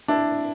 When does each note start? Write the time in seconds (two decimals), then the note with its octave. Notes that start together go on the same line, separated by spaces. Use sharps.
0.08 D4 E4